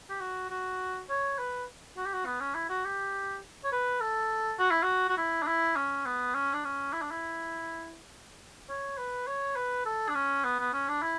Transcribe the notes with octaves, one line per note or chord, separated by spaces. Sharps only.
G4
F#4
F#4
C#5
B4
F#4
G4
F#4
B3
C#4
E4
F#4
G4
C#5
B4
A4
F#4
E4
F#4
F#4
E4
D4
E4
C#4
B3
C#4
D4
C#4
E4
D4
E4
C#5
B4
C#5
B4
A4
D4
C#4
B3
B3
C#4
D4
E4